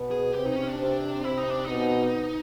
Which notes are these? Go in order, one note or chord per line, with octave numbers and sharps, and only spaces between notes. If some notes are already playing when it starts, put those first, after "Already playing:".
Already playing: B2 B3
G#4
C3 C4 G4
D#4
C#4
D4
C3 C4
C3 C4 E4
D#4
D4
B2 B3 D#4